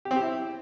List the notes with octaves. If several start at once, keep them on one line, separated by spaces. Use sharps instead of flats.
G4
C4
G4
E4